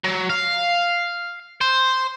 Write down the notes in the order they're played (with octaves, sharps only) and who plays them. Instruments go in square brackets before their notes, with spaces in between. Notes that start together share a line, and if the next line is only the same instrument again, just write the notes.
[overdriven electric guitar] F#3
F5
C5